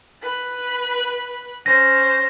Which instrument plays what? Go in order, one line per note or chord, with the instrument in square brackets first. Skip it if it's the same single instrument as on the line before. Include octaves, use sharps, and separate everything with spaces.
[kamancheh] B4 B5
[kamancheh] C#4 C5 [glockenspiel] A#6